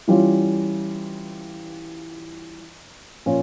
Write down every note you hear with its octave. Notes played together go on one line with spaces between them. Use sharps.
E3 G3 C#4 F4
A#2 F3 C#4 F4